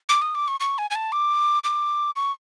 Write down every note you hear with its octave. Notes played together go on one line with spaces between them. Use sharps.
D6
D#6
D6
C#6
C#6
G#5
G#5
A5
D6
D6
C#6